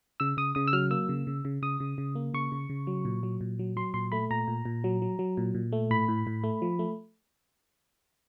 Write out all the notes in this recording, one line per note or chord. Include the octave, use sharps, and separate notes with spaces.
C#3 E6
C#3 D#6
C#3 D#6
E6
F#3 F6
A#3 E6
C#3
C#3
C#3
C#3 D#6
C#3
C#3
A#3
C#3 C#6
C#3
C#3
F#3
A#2
F#3
A#2
F#3
F#3 C6
A#2 C6
A3 B5
A#2 A#5
A#2
A#2
F#3
F#3
F#3
A#2
A#2
A3
A2 B5
A2
A2
A3
F3
A3